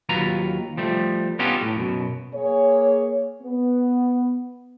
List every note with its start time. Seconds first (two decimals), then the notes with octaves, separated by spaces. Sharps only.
0.09 D#2 F#3 F4 B4 A#5
0.77 F3 G3 A3
1.39 B3 C#4 D#4 F4 G4 A4
1.62 A2
1.76 F#2 B2
2.34 A#3 G#4 C#5
3.43 B3